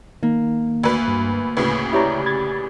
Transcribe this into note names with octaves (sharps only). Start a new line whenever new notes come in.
D#3 A#3
D2 B4
G2
D2 A2 C#3 B4
E4 G4 B4 C#5 D5 A#5
B5 G#6 A6